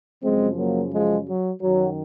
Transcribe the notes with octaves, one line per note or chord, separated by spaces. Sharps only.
F#2 C#3 F3 G#3 C4
F#3 A#3
F3 G#3
F#3
F#2 D#3 F#3